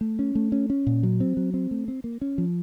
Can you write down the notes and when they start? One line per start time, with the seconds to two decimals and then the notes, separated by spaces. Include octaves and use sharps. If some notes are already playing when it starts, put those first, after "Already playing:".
0.01 A3
0.19 C#4
0.35 A3
0.52 C#4
0.70 C#4
0.87 A#2
1.03 F#3
1.20 C4
1.37 F#3
1.54 C4
1.71 A3
1.88 C4
2.04 A#3
2.21 C#4
2.38 F3